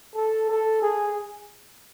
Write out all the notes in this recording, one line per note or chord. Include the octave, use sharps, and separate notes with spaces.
A4
A4
G#4